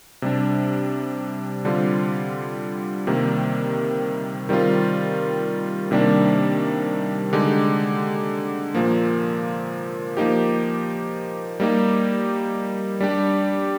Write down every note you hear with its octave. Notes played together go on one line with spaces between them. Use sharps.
C3 G3 D4
D3 G3 C4 F4
C3 D#3 G3 A#3
D#3 G3 C4 F4
C3 D#3 G3 A#3 D4
D3 G#3 D#4 G4
A#2 F3 A#3
F3 A#3 D#4 G4
G3 A#3 D#4 G4
G3 D4 G4